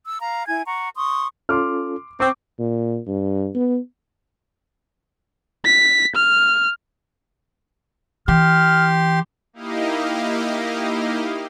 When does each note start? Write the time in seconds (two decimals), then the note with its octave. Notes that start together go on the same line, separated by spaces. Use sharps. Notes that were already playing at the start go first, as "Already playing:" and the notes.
0.06 E6
0.21 F5 A#5
0.48 E4 G#5 G#6
0.66 F#5 A#5 C#6
0.96 C6 C#6 D#6
1.49 C#4 F4 A4 C6 D6 F6
2.20 C4 C#6 D6
2.59 A#2
3.07 G2
3.55 B3
5.65 B6
6.15 F6
8.28 E3 G4 C6 F6
9.53 A#3 D#4 E4 G4 D#5 F5